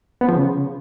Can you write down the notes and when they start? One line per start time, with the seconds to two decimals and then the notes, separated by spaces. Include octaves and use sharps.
0.21 B3
0.29 F3
0.36 C#3